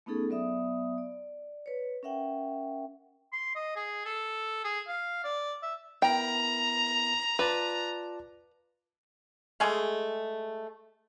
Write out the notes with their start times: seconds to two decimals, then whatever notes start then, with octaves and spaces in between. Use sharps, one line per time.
0.06 A3 B3 C#4 D#4 G#4 A4
0.29 F#3 B3 D5 E5 D#6
0.98 D5
1.66 B4 C#5
2.03 C#4 A#4 E5 F#5 G5
3.33 C6
3.55 D#5
3.76 G#4
4.05 A4
4.64 G#4
4.88 F5
5.24 D5
5.63 E5
6.02 B3 E4 A#4 G5 A#5
7.39 F4 B4 D5 A5
9.60 G#3 A3 G#4 F5